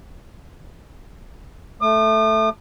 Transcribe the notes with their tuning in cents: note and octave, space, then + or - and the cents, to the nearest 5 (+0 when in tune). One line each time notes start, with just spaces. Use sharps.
A3 +0 D#6 -45